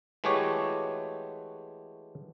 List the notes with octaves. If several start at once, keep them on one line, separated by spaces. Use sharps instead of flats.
E3 G#3 A3 F#4 G4 C#5